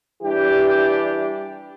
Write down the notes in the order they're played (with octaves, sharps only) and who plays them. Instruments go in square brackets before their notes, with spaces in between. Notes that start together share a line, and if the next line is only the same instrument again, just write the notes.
[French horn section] E3 G3 D4 E4 G4